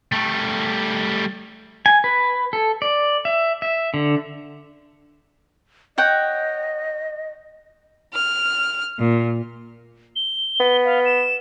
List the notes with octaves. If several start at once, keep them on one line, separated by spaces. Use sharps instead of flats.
G3 A3
G#5
B4
A4
D5
E5
E5
D3
C#5 D#5 F#5 G5
F6
A#2
G7
B3
F5
E7